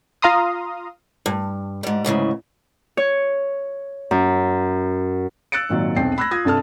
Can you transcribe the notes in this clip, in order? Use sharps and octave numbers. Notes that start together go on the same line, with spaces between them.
F4 F5 A#5 C6 D#6
G2
G#2 G3
D2 G#2 C#3 E3
C#5
F#2
E6 F#6 A6 C#7 D7
G#1 A#2 D#3 F#3
E1 B1 C4 G5 C7
B5 E6 F#6 G#6 A#6
F4 D#6 G#6 A#6
G2 C3 A4 A5 F6